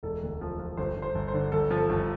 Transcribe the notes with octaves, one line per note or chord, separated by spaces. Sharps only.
E1 A4
D2
F3
F3
G1 C5
G1
C5
G1
C5
D3
G1 A4
F3
A4
G1